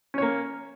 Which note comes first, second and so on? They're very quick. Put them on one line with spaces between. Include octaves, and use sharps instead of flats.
C#4 C#5 A#3